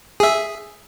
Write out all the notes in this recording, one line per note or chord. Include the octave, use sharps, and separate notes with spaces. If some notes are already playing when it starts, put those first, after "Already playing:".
G#4 E5